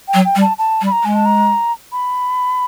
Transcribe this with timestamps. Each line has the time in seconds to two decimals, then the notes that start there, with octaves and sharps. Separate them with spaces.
0.08 G5
0.14 F#3
0.25 G5
0.36 G3
0.41 A5
0.58 A5
0.81 G3
0.86 B5
0.92 A#5
1.04 G#3 G#5
1.15 A5
1.25 A#5
1.92 B5